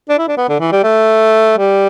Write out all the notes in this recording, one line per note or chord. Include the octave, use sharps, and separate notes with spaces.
D4
E4
D4
B3
D3
E3
G3
A3
G3